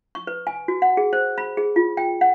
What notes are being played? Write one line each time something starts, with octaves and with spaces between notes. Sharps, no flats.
C#6
B4
G#5
F#4
F#5
G#4
C5
B5
G#4
F4
G5
F#5